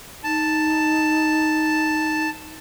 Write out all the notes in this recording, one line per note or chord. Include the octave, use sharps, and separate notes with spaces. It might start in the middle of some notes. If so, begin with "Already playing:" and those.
D#4 A5